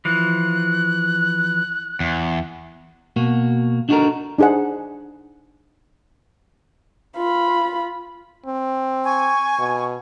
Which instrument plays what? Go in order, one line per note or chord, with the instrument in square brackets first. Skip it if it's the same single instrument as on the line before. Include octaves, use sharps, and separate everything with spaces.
[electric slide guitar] E3 F3 [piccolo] F#6
[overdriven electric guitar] E2
[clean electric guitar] B2 A#3 F#4
D4 D#4 F#4 G4 A4 A#4
[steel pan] D4 D#4 G#4 C5 F#5
[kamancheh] F4 B5
[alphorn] C4
[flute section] G#5 C#6
[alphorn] B2